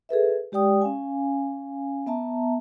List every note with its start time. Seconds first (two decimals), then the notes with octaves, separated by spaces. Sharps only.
0.09 G#4 A4 B4 E5
0.52 G#3 G4 D5 G5 D#6
0.81 C#4 F5 G#5
2.07 B3 E5 A5 A#5